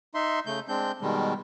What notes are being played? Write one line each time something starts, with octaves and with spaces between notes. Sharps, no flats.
D#4 E5 C6
C#3 A3 G6
G#3 C4 D4 G6
B2 D#3 G3 G#3